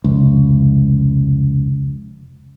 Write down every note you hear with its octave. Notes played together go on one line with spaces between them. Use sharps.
F1 C#2